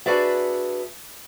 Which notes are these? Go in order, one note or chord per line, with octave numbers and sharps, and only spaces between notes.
D4 F#4 G#4 B4 D5 E5